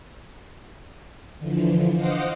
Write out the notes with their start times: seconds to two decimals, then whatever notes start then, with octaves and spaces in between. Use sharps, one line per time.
1.38 D3 E3 F3
1.95 C5 D#5 F5 F#5 D6 D#6